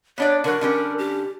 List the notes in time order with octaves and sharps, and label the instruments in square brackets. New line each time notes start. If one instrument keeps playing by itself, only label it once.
[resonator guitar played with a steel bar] B3 D4 D5 [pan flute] C#5
[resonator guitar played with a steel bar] D3 F#3 [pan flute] A#4
[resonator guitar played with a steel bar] D3 G3 C#4
[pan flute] G4